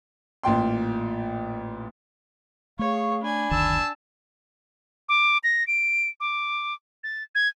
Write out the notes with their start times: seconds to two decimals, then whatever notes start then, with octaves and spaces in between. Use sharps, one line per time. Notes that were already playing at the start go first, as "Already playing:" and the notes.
0.43 A1 A#2 G5 C6
2.79 A3 G#4 C#5 F5 C#6
3.22 D4 G#5 B5
3.51 F#1 D2 D#3 A5 E6
5.09 D6
5.44 A#6
5.67 D7
6.20 D6
7.04 A6
7.35 G#6